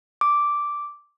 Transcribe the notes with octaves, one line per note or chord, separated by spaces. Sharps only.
D6